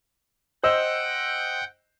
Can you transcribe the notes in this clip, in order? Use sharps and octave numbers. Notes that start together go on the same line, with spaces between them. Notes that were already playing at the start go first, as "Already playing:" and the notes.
C5 D#5 F#5 G5 E6